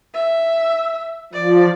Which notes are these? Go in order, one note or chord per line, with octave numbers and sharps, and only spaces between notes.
E5
F3 D5